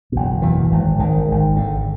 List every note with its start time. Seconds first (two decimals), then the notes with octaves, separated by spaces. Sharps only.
0.12 F#1 E2 B2
0.42 F#1 E2 B2 E3
0.70 G#1 G#2
0.99 G#1 G#2 D#3
1.28 G#1 G#2
1.56 G#1 G#2 D3